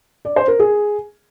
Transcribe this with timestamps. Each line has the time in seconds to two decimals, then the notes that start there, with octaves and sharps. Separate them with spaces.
0.25 D5
0.36 C5
0.48 A#4
0.59 G#4